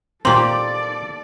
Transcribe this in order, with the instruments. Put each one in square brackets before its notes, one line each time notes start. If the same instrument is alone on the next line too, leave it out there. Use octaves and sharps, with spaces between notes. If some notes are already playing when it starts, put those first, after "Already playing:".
[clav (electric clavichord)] A#2 C4 [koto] A#3 G4 [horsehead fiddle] A4 D5 [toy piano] C6